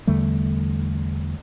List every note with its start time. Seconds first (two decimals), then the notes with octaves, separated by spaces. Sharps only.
0.07 E2 D3 G3 A3